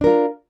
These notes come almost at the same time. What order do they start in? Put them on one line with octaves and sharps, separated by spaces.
D4 A#4 F4